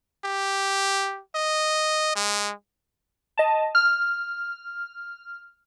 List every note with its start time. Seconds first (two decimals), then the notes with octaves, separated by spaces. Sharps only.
0.25 G4
1.35 D#5
2.16 G#3
3.38 D#5 A5
3.75 F6